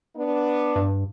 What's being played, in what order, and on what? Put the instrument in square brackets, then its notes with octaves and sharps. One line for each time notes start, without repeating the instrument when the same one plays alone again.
[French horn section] B3 D4
[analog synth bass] G2